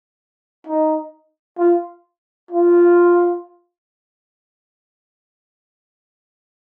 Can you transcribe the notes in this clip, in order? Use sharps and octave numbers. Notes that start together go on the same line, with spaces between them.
D#4
F4
F4